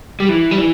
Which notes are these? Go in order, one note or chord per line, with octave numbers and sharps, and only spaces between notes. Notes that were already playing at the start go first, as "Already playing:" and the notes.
G3
E3
G3
E3